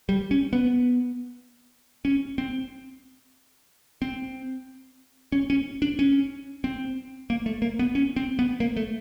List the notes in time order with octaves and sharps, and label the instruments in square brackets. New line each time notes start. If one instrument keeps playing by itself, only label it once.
[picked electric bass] G3
C#4
B3
C#4
C4
C4
C#4
C#4
D4
C#4
C4
A#3
A3
A#3
B3
C#4
C4
B3
A#3
A3